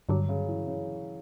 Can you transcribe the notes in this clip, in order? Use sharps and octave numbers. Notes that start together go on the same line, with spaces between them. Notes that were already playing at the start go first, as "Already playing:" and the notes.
G2 D3 F#3 G3
C#3
E3
C#3